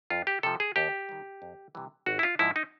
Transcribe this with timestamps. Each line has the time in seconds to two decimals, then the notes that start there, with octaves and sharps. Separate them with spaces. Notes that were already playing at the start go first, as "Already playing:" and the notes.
0.10 F2 F4
0.27 G4
0.43 C3 F3 A4
0.60 G#4
0.76 D#2 G4
1.09 D#3 G3
1.42 F2
1.75 C3 E3 G3
2.06 G#1 F#4
2.19 E4
2.23 F4
2.39 G#2 F3 E4
2.56 D#4